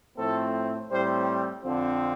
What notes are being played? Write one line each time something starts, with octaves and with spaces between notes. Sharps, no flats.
A2 F3 A3 C4 A4
A2 G3 C4 C5
F2 D3 F3 C4